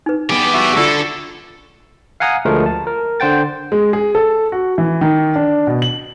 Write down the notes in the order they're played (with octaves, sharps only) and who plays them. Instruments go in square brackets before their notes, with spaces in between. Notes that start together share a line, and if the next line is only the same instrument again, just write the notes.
[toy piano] D#4 B4
[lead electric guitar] B3 G#4 [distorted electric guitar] G4 D5
[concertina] F#4 E5
[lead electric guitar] D3 [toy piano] F4 D5 E6 [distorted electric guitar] A4
[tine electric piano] F5 F#5 G#5 A#5 D#6
D2 F3 G#3 A3 A#4
A5
A#4
D3 C5 F#5 G5 A6
[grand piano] G#3
G#4
A4
F#4
E3
D#3
D4
B2
F#7